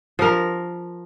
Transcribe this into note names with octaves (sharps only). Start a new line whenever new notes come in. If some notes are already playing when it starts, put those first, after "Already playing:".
F3 A#4